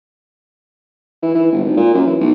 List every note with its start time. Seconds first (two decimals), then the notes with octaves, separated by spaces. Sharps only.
1.22 E3
1.35 E3
1.52 G1
1.64 G#1
1.77 A#2
1.94 F#2
2.06 E3
2.20 B1